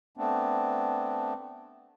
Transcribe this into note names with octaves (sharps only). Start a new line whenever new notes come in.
A3 B3 C4 D4